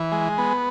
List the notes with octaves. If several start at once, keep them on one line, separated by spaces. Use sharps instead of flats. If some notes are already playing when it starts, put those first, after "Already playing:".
Already playing: E3
G#3
B3